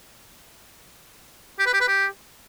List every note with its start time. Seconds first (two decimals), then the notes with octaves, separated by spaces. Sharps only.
1.59 G4
1.66 B4
1.74 G4
1.81 B4
1.88 G4